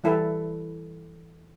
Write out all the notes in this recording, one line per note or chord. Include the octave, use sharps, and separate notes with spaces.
E3 G3 E4 A4 B4